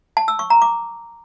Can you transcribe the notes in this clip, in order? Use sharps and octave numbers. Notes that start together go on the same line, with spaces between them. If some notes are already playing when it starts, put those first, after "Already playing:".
A5
E6
C#6
A#5
D6